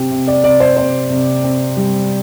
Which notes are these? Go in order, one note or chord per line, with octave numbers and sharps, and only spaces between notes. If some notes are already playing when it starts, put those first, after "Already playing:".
Already playing: C3 C4 G4
C3
D5
C3 D5
C5
C3 C5
C3
C4
G3